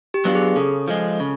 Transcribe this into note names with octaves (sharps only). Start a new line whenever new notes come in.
G4
F#3 B3 D4 F4
G#4
C#3 A4
F3 G#3
C#3